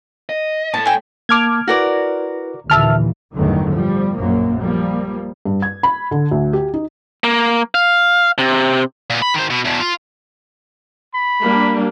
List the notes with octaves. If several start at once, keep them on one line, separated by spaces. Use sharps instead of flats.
D#5
A2 A3 A5
G5 G#5
A#3 A5 D6 F6 G#6
E4 F#4 A#4 B4 D5
D#2 A#2 D3 E3 E5 A5 F6
G1 E2 A2 D3 D#3 F#3
F3 G3
A#1 F#2 A#3
F3 G3 A#3
G2
G#6
B5
D3
D2
G4
D#4
A#3
F5
C3
A#2 B3
B5
D#3 C5
B2
E2 B2
F4
B5
G3 A#3 D4